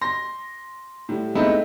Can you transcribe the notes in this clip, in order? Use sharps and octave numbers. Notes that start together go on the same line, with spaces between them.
C6 A#6
A2 G3
G#3 A3 B3 C4 D#4 E4